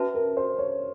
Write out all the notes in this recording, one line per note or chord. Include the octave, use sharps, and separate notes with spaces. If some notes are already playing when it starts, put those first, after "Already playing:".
Already playing: C#4 F#4 B4 E5 A5
A#4
C5
C#5